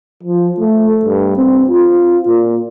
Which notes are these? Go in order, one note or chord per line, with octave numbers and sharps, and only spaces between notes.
F3
A3
G2
C4
F4
A#2